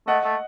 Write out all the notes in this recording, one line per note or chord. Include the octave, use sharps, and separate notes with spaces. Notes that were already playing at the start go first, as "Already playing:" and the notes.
A3 D#5 F#5
A3